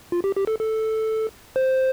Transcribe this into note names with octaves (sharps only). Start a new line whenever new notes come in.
F4
G4
G4
A4
A4
C5